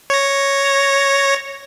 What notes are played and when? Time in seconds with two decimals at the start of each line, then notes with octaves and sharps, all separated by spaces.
0.10 C#5 A#6